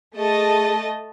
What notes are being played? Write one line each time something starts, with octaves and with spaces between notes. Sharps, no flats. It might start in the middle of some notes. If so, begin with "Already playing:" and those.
A3 G#4 D#5 A5